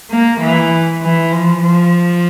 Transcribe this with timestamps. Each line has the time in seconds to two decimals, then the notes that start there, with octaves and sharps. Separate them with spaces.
0.11 A#3
0.41 E3
1.03 E3
1.32 F3
1.62 F3